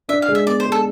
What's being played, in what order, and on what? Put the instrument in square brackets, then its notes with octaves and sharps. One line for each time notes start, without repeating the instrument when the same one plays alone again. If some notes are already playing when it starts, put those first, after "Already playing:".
[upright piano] D4 [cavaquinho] E5
[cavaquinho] F5
[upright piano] G#3
[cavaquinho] E5
[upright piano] B3 [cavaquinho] D5
[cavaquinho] C5
[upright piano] G#3
[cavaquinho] A4